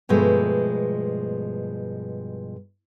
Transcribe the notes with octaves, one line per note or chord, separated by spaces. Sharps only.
G2 B2 F3 G#3 A3